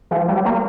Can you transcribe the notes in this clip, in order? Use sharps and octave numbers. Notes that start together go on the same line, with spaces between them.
F3
G3
A#3